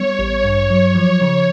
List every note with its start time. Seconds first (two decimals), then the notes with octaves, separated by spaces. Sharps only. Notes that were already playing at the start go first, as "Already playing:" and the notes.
Already playing: G3 B3 C#5
0.19 A1
0.44 G2
0.70 F#3
0.95 F3
1.21 C#3